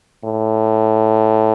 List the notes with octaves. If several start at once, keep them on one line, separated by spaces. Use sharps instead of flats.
A2